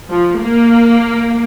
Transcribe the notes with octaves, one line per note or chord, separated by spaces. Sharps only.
F3
A#3